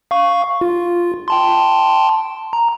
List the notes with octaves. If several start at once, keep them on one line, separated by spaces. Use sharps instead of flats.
F5 C#6
F4
G5 A5 C6
A#5